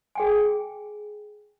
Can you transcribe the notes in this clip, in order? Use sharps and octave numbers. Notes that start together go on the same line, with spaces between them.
G#4 G5 G#5